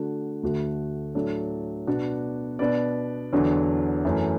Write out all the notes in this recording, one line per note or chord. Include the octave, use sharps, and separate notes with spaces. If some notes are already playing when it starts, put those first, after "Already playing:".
Already playing: D3 A3 D4 F#4
D2 D3 A3 F#4
A2 F#3 D4 A4
B2 B3 D4 F#4 D5
B2 B3 D4 B4 D5
E2 D3 F#3 D4
F#2 E3 A3